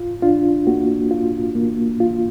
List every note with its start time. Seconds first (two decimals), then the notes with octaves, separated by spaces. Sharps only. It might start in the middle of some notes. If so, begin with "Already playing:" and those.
Already playing: F4
0.22 D4 F4
0.67 A#3 F#4
1.11 F4
1.55 A#3
2.00 F4